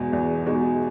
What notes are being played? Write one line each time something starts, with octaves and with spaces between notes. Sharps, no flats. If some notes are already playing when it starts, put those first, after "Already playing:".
Already playing: E2 B2 G#3 D#4
E2
B2 G#3 D#4